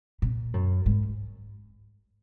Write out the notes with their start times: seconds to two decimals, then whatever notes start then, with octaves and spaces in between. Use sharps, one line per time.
0.22 A#2
0.54 F#2
0.86 G#2